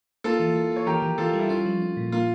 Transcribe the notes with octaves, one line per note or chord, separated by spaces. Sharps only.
A#3 F4 A4
E3
A#3
A#3 C#5
E3 G4 A#4
E3
E3 F4 A4
G3
E4
C#4 F4
F3
C#4
A#2
A#3 F4